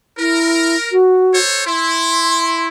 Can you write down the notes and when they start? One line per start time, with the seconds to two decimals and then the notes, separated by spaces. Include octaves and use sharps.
0.18 E4 A#4
0.92 F#4
1.34 A4 C5 C#5
1.66 E4 C6